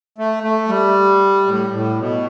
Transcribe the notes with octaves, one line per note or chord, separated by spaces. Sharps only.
A3
A3
G3
A2
A2
B2